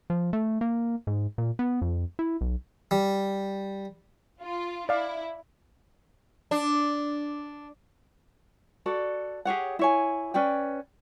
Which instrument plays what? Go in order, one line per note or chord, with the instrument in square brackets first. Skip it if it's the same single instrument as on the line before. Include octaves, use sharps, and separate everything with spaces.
[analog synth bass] F3
A3
A#3
G#2
A#2
B3
F2
E4
B1
[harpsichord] G3
[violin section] F4
[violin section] E4 [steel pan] D5 F5
[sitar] D4
[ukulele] F#4 A4 D5
G4 G#4 C#5 F#5
E4 C#5 G#5
C#4 B4 D5 G5